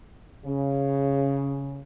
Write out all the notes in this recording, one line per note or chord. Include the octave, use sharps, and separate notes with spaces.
C#3